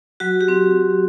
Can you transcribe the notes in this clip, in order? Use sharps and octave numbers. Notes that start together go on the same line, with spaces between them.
F#3 F#4
G4
C4